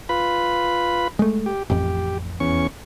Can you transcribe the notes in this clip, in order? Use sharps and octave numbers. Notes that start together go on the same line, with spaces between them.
F4 B4 B5
G#3 A3
G4
A1 F2 G4
E2 C#4 C#6